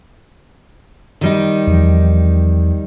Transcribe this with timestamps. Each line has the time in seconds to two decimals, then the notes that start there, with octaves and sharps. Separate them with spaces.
1.21 D#3 G3 D#4
1.67 E2 F3